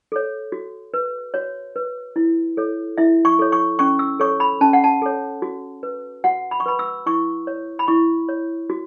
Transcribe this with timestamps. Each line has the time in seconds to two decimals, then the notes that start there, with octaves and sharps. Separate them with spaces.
0.12 A4 C#5
0.52 F#4
0.94 B4
1.34 F#4 C#5
1.76 B4
2.16 E4
2.57 A4 C#5
2.98 E4 E5
3.25 C#6
3.39 A4 C#5
3.52 C#6
3.79 C#4 C#6
3.99 E6
4.20 A4 C#5 C#6
4.40 B5
4.61 C#4 A5
4.73 F#5
4.84 A5
5.02 A4 C#5
5.42 F#4
5.83 B4
6.24 F#4 F#5
6.51 B5
6.60 C#6
6.66 B4 B5
6.79 E6
7.06 E4 C#6
7.47 C#5
7.79 B5
7.88 E4 C#6
8.29 C#5
8.70 F#4